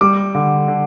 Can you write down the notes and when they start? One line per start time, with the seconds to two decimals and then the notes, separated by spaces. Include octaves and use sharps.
0.01 G3 D6
0.35 D3
0.68 D3